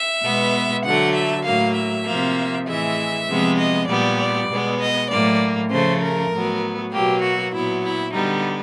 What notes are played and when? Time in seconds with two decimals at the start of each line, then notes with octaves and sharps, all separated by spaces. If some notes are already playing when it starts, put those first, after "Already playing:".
Already playing: E5
0.23 B2 G#3 B3
0.85 D3 F#3 A3 F#5
1.15 E5
1.45 A2 F#3 A#3 F5
1.75 E5
2.06 C3 F3 A#3
2.66 A2 E3 G#3 E5
3.28 C3 F3 G#3 B3
3.58 D#5
3.88 A#2 G3 B3 D5
4.18 D5
4.48 B2 G#3 B3
4.79 D#5
5.10 A2 F#3 A#3 D5
5.70 C#3 F3 A3 C5
6.01 A#4
6.31 A2 F#3 B3
6.92 B2 F#3 A#3 G4
7.22 F#4
7.53 A#2 F#3 B3 E4
7.84 E4
8.13 D3 G3 B3 D#4